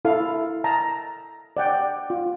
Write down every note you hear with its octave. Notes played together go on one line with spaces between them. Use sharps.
E4 A4 F5
A5 A#5
D5 F#5 G5
F4